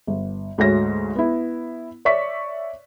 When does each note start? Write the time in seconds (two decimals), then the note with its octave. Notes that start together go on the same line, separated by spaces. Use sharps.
0.07 G1
0.58 D2 G#2 A3 F#4 C#5 A#6
1.16 B3 E4
2.05 C#5 D5 E5 C#6 B6